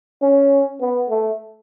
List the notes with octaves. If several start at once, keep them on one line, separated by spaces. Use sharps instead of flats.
C#4
B3
A3